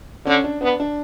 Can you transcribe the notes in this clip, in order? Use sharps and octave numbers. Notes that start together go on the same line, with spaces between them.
D3 C#4
D4
B3 D4
D4